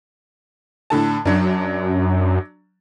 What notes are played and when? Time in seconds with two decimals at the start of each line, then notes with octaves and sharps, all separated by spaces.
0.90 A2 D3 A5
1.25 F#2 F#3 D4